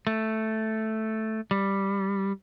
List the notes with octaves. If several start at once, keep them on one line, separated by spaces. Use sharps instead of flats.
A3
G3